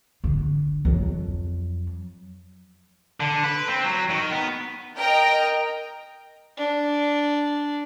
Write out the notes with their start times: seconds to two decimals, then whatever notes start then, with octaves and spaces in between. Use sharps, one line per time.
0.24 D3
0.85 F2 F#3
3.20 D3
3.44 B4
3.68 C4
3.84 F#3
4.09 D#3
4.32 B3
4.96 A#4 D#5 G5 A#5
6.57 D4